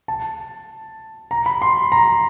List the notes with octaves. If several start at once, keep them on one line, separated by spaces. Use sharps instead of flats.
A5
A#5
B5
C6
A#5